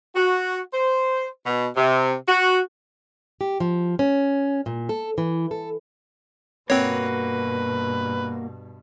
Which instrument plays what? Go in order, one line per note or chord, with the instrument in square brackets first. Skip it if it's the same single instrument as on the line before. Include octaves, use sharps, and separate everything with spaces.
[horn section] F#4
C5
B2
C3
F#4
[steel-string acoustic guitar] G4
F3
C#4
A#2
A4
E3
A4
[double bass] G2 B2 [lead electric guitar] A#3 F#4 [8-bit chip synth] C4 C#5 [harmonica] B4